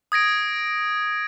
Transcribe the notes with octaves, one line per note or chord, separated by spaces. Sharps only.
D#6 G#6 A#6 D7